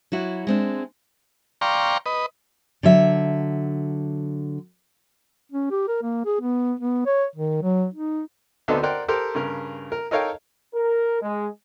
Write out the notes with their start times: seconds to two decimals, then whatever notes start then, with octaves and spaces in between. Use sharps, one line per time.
0.12 F#3 E4 F#4
0.47 G#3 C4 D4
1.61 D5 F5 G5 A#5 C6 C#6
2.06 B4 D#5
2.83 D3 F#3 E5
5.52 C#4
5.71 G4
5.88 A#4
6.02 A#3
6.25 G#4
6.41 B3
6.80 B3
7.06 C#5
7.36 D#3
7.62 F#3
7.94 D#4
8.68 D2 B3 C4 D4 D#4 A4
8.83 A#4 C5 D5 F#5 G5
9.08 G4 A4 A#4 C5 G5
9.35 G2 C#3 A#4
9.92 A#4
10.11 D#4 A4 A#4 C#5 F5 G5
10.74 A#4
11.22 G#3